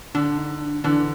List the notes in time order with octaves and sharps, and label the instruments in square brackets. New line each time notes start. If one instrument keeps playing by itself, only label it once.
[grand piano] D3 [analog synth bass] D4
[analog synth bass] D#4
D4
[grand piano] D3 E3 [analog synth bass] D4